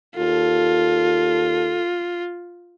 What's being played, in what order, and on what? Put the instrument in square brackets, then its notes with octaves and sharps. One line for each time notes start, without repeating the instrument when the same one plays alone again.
[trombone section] D#2 A4 [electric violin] F4